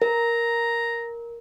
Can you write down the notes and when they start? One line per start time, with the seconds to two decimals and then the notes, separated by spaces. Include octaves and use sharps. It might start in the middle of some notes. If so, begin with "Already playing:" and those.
0.02 A#4 A#5